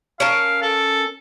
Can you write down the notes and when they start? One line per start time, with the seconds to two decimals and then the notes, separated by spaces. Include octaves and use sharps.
0.20 C#4 A#4 F5 A5
0.62 A4